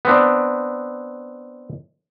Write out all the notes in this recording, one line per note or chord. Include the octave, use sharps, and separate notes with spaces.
B3 C4 D4